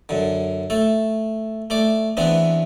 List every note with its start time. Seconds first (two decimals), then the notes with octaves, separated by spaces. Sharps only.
0.09 F#2 D3
0.70 A3 A4
1.70 A3 D5 D6
2.17 E2 E3 B3 C4 D4